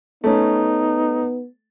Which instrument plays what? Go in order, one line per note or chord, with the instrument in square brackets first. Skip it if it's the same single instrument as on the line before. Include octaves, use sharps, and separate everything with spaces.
[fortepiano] A3 C#4 [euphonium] B3 [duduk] D#4